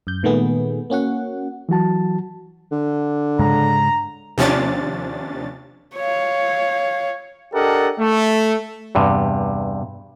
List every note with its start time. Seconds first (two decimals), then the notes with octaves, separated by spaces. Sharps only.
0.07 F#2 G6
0.23 A#2 D#3 G#3 A3 B3 G#4
0.90 A#3 C#4 F#4 F#5
1.69 E3 F#3 F#4 A5
2.72 D3
3.39 G#2 C#3 G#3 A#5
4.38 D#2 C3 F3 C#4 D4 A6
5.96 C#5 F5
7.54 D4 G4 A4 A#4 D#5 F#5
7.99 A3
8.95 E2 G2 C3